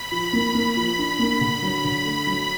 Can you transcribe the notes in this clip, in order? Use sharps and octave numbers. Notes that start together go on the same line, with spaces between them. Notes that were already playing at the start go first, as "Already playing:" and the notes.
Already playing: B5
F3
A#3
A#3
F3
D4
A#3
D3
F#3
D3
A3
F#3